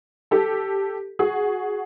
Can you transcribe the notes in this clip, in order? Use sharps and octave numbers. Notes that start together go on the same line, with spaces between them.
G4 A4
F#4 G#4